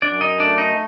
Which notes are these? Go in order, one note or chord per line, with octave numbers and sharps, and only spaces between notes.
F#2 D4 D5
D#4 D#5
A3 D4 D5
D#4 D#5